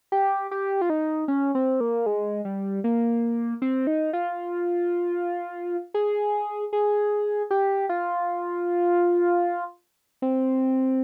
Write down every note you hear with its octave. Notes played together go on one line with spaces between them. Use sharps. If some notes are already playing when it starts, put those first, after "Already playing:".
G4
G4
F4
D#4
C#4
C4
A#3
G#3
G3
A#3
C4
D#4
F4
G#4
G#4
G4
F4
C4